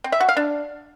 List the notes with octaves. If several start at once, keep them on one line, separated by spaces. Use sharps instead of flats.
C4
E5
F#4
F5
D4